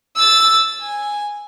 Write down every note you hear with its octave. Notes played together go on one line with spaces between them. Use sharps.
E6 A6
G#5